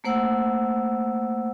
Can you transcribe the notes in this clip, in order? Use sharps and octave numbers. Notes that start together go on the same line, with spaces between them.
A3 A#3 C5 F#5 E6